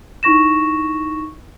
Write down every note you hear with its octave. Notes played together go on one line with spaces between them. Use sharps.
D#4 E4 C#6 A#6 E7